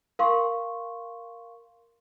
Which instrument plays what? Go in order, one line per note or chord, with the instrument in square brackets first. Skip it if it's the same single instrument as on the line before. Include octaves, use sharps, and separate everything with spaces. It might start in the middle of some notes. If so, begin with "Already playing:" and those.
[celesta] A#4 F5 C6 C#6